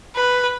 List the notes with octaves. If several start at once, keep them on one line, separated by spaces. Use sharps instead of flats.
B4